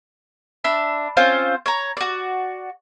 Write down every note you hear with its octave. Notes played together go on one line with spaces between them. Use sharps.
D4 E5 B5
C4 C#4 F4 C5
C#5 A#5
F#4 D5